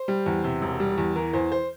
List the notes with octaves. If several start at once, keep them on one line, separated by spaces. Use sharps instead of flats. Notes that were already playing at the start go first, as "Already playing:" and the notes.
Already playing: C5
G3
E2
C3
E1
G3
E2
E3 A#4
E2 C5
C5